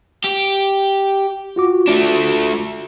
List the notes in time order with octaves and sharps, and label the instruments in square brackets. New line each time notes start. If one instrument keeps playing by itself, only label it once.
[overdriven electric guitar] G4
[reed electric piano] F4 F#4 D6
[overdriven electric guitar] A3 D4